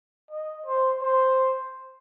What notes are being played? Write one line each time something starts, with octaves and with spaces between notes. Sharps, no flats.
D#5
C5
C5